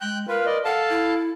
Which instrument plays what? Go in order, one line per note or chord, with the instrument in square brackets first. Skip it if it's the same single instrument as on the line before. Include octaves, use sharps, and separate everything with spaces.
[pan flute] G#3 [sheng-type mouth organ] G5 F#6 G6
[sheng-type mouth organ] F4 B4 [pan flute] A#4
[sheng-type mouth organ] D5 D#5
[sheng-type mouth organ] A4 F5 A5 [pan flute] F#5
[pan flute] E4